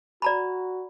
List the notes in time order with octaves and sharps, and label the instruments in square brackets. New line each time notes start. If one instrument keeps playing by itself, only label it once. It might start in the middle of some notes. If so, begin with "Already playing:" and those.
[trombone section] F#4 [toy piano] D5 A#5 B5